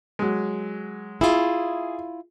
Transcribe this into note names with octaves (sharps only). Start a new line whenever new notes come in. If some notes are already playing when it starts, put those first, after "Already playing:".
F#3 G#3
E4 F4 G#4